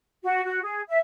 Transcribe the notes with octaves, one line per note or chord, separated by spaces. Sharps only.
F#4
F#4
G#4
E5